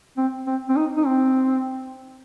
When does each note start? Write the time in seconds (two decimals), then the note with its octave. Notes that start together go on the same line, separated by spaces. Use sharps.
0.17 C4
0.47 C4
0.69 C4
0.76 D#4
0.97 D#4
1.06 C4